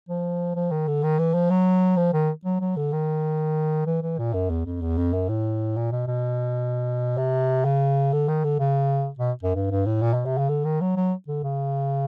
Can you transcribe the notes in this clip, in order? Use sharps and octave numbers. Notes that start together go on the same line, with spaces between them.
F3
F3
D#3
D3
D#3
E3
F3
F#3
F3
D#3
F#3
F#3
D3
D#3
E3
E3
A#2
F#2
E2
F2
E2
F2
F#2
A2
A#2
B2
B2
C3
C#3
D3
D#3
D3
C#3
B2
F#2
G2
G2
A2
A#2
B2
C3
C#3
D3
D#3
F#3
F#3
D3
C#3